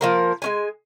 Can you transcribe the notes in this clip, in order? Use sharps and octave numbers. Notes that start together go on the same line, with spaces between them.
F3 A#3 A#4
G#3 C#4 G#5